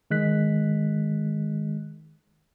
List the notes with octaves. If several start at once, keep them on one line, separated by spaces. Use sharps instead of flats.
D#3 G#3 F#6 B6